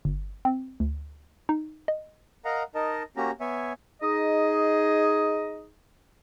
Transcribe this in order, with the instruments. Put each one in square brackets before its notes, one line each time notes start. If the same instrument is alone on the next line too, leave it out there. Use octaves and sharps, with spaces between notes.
[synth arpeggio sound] G1
C4
D2
D#4
D#5
[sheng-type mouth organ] A#4 D#5 F5 F#5 A#5
D#4 A#4 D#5 A5
A#3 C#4 F#4 G4 A#5
B3 C#5 E5 G#5
[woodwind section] D#4 G#4 D#5